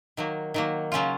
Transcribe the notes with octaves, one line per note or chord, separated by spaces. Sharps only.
D#3 F#3 A#3
D#3 F#3 A#3
C#3 F#3 C#4 F4